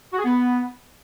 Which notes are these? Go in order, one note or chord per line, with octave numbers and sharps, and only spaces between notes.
F#4
G#4
B3